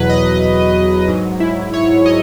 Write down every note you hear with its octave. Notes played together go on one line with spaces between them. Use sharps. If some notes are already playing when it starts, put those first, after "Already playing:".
Already playing: E2 B2 F#3 B4
D#5
G#2 F#3
E4
C#5
D#5